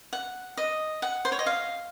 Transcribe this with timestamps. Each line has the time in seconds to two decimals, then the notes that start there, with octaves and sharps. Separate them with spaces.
0.13 F#5
0.57 D#5
1.02 F#5
1.25 C5
1.32 C#5
1.39 D#5
1.47 F5